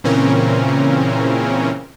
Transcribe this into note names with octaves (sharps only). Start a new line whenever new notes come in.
A#2 C#3 E3 C4 C#4 A#4